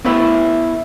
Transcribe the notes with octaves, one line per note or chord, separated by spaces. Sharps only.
B3 C#4 E4 A4 B4 E5